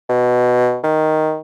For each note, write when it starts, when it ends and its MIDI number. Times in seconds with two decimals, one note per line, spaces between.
0.09 0.78 47
0.83 1.39 51